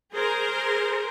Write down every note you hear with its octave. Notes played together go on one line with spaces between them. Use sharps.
G#4 A#4 C5